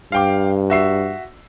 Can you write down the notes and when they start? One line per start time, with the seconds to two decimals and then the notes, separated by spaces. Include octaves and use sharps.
0.12 G2 F5 G5 D6
0.70 F#4 E5 C7